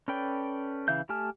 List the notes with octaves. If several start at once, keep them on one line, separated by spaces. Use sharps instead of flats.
C#4 A4 B4 D5 G5
C#3 E3 E5 F5 G6
A3 G4 G#5 A5 F6